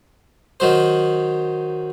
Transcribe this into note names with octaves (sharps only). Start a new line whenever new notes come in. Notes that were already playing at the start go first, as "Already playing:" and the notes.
D#3 F#3 C5